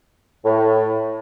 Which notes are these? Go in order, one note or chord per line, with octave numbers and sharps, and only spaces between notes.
A2